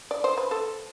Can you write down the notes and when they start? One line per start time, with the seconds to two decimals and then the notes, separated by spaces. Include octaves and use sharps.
0.11 D5
0.24 C5
0.38 B4
0.51 A4 C5